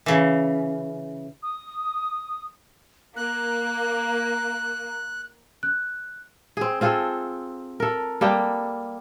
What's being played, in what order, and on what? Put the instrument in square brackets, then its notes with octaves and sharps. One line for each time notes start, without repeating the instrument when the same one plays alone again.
[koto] C#3 E3
[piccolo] D#6
[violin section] A#3 [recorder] F#6
[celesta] F#6
[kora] C4 G#4
C4 F4 G#4 A4
A4 A#4
G3 A#3 A4 G5